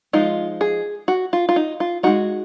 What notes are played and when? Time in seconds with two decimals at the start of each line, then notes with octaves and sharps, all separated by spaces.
0.13 F3 G#3 D#4 F4
0.61 G#4
1.08 F#4
1.33 F4
1.49 F4
1.56 D#4
1.80 F4
2.03 G#3 D#4 F#4